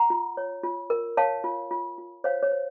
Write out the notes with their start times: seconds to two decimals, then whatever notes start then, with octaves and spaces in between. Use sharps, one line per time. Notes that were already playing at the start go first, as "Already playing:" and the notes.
Already playing: F#5 A#5
0.10 F4
0.37 C#5
0.63 F4
0.90 A#4
1.17 C#5 F5 A5
1.44 F4
1.71 F4
1.98 F4
2.24 C5 C#5 F5
2.43 C#5
2.51 C5